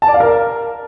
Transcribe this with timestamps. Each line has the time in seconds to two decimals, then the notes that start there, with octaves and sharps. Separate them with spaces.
0.02 A5
0.08 D5
0.14 F5
0.20 A#4